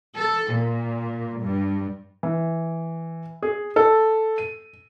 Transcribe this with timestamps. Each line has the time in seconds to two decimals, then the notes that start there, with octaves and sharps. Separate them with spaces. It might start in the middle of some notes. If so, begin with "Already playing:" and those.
0.16 A4
0.54 A#2
1.41 G2
2.23 E3
3.43 G#4
3.76 A4
4.38 D#7